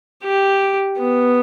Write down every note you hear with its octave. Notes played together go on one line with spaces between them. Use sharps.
G4
B3